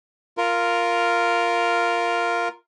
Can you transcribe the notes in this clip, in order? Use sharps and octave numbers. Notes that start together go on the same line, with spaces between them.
F4 A#4